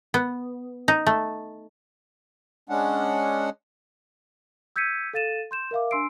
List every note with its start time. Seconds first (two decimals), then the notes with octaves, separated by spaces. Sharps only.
0.14 B3
0.88 D#4
1.06 A3
2.69 G#3 C#4 D4 F#5
4.76 E6 G6 G#6 B6 C#7 D#7
5.14 A4 F5 A6 D#7 E7
5.51 C6 G6 E7
5.71 A#4 E5 F5 D6
5.91 D4 G#5 C6 E6 C7 D7